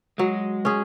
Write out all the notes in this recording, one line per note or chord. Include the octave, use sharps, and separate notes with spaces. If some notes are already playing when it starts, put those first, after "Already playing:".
F#3 G#3
C#4 G#4